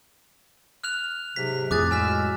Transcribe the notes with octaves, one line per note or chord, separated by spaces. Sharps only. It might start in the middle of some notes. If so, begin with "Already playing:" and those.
F6 F#6 F7
G#2 C3 F#3 B6
F2 A2 G#4 D6 F#6 A6
F#3 G#3 G#5 E6 F6 B6